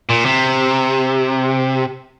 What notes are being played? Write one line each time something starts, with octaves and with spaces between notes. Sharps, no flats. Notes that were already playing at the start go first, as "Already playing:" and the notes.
A#2
C3